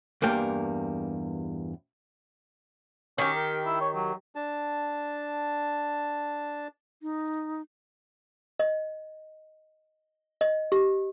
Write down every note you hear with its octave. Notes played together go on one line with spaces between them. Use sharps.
E2 G2 G3 A#3 G5
D#3 C#4 G4
A#4
E4
C#5
F#3
D4 A5
D#4
D#5
D#5
G4